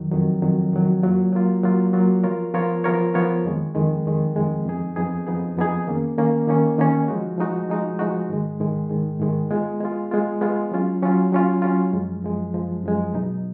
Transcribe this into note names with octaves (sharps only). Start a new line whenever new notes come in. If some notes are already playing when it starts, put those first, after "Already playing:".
Already playing: F2 D#3 F#3
F2 D#3 F#3
F2 D#3 F#3
F2 D#3 F#3
F#3 A#3 F4
F#3 A#3 F4
F#3 A#3 F4
F#3 A#3 F4
F3 B3 F4 A#4 C#5
F3 B3 F4 A#4 C#5
F3 B3 F4 A#4 C#5
F3 B3 F4 A#4 C#5
F2 D#3 G#3
F2 D#3 G#3
F2 D#3 G#3
F2 D#3 G#3
F2 F3 B3 D#4 G#4
F2 F3 B3 D#4 G#4
F2 F3 B3 D#4 G#4
F2 F3 B3 D#4 G#4
D#3 A#3 C#4
D#3 A#3 C#4
D#3 A#3 C#4
D#3 A#3 C#4
F3 G#3 D#4 F#4
F3 G#3 D#4 F#4
F3 G#3 D#4 F#4
F3 G#3 D#4 F#4
G#2 D#3 G#3
G#2 D#3 G#3
G#2 D#3 G#3
G#2 D#3 G#3
G#3 B3 F4
G#3 B3 F4
G#3 B3 F4
G#3 B3 F4
F#3 C#4 F4
F#3 C#4 F4
F#3 C#4 F4
F#3 C#4 F4
F#2 F3 G#3
F#2 F3 G#3
F#2 F3 G#3
F#2 F3 G#3
B2 F#3 B3 D#4